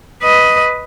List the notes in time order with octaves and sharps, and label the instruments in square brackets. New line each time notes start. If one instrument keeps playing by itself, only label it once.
[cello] B4 D#5